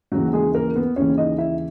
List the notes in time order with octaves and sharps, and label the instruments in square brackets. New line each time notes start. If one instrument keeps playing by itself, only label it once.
[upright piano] D#2 C#3 E3 F#3 F#4
G#3 G#4
A#3 A#4
B3 B4
D#2 C#3 E3 C#4 C#5
D#4 D#5
E4 E5